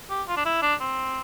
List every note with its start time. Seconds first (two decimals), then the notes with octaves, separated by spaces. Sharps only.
0.10 G4
0.28 F4
0.37 D4
0.45 E4
0.62 D4
0.80 C4